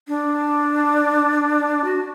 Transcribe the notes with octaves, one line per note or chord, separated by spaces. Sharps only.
D4
F#4